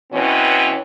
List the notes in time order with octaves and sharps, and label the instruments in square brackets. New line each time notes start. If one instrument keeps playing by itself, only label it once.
[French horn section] B2 E3 C4 C#4 C#5